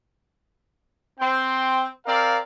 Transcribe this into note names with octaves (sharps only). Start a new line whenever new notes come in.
C4 G5 C6
C4 A#4 D5 F5